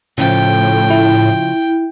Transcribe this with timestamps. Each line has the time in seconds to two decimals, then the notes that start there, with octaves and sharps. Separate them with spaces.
0.18 A2 C#3 F3 G5
0.90 E4